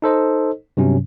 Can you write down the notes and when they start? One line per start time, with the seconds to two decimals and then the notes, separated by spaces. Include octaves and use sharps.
0.02 D#4 A4 C5 D#5
0.77 G2 C3 F#3 C#4